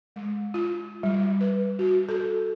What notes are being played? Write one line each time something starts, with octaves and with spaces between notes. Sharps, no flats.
G#3
F4
G3
B4
F#4
A4